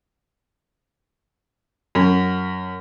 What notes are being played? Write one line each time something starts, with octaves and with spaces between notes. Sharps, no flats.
F#2